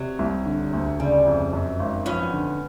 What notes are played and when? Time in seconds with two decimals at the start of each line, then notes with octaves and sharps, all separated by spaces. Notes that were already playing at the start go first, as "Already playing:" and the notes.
Already playing: C3 F#3
0.19 C2
0.46 D3
0.73 D2
0.99 C#3 G3
1.26 F2
1.53 F#2
1.80 G#1
2.06 F3 B3 C#4
2.33 D3